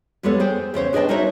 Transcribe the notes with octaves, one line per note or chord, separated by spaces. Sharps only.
F2 G3 G#3 B3 A4 C#5
G#4 C5 G5
E2 C#3 C5 C#5
D4 G#4 B4 D#5 G5 A5
D#4 F#4 A#4 C5 C#5 E5